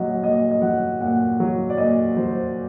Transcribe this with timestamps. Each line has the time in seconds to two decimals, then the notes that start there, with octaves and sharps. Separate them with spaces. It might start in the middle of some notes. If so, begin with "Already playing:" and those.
Already playing: A#2 F#3 D#5 F#5
0.24 A#2 D#5
0.51 D#5
0.62 F#3 F#5
1.01 A#2 F#5
1.40 F#3
1.70 D5
1.78 A#2 D#5
2.17 F#3 C5